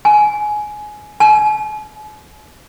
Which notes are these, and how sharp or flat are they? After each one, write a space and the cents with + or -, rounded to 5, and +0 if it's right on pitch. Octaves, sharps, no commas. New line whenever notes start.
G#5 +15
G#5 +45